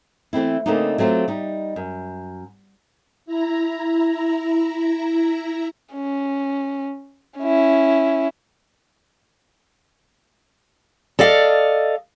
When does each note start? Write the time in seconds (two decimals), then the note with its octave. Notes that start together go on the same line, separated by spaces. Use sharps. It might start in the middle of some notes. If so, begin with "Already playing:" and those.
0.33 E3 A3 C4 E4
0.66 C#3 A3 A#3 C4 D4 D#4
0.98 F#3 A3 C4 E4 F4 G4
1.28 G3 D#4
1.76 F#2
3.26 E4 A#5
5.95 C#4
7.39 C#4 E4
11.19 A4 D5 D#5 F5